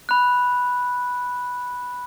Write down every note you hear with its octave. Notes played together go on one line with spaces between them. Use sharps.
B5 F#6